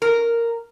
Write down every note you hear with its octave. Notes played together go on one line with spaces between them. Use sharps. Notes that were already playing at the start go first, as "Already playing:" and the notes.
A#4